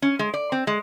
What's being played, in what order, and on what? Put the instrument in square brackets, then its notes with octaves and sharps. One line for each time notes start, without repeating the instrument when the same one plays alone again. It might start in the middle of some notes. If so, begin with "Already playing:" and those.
[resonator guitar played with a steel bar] C#4
G#3
D5
C4
G#3